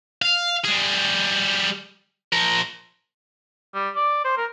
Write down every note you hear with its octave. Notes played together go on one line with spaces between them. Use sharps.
F5
G3 G#4
F3 A#4
G3
D5
C5
A#4